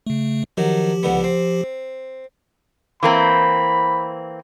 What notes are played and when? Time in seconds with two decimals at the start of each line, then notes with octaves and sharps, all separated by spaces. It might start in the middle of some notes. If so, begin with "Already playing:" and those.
0.07 C#3 A3
0.57 D#3 F3 F#3 G4
1.03 C#2 D3 B3
1.24 C4
3.03 E3 A#3 C4 B5